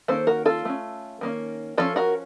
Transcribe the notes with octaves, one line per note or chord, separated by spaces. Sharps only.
D#3 A#3 C#4 A4 C5
F#4 A#4
F4 A4
A3 C#4
D#3 A#3 C#4
F3 A#3 C#4 F4 A4
F#4 A#4